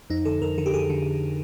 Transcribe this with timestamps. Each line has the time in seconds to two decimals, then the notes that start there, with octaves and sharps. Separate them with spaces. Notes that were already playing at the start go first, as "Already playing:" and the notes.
0.10 F2 D#4
0.25 D3 A4
0.42 F2 A#4
0.58 D3 A4
0.66 G4
0.74 F2 G#4
0.90 D3